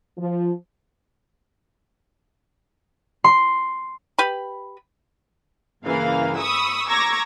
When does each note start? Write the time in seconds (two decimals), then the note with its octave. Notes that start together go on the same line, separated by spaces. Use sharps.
0.18 F3
3.24 C6
4.19 G4 B4 B5
5.84 G2 C#3 E3 A#3 F5
6.37 B5 C#6 D#6 E6
6.89 A#5 C#6 D6 E6 G#6 A#6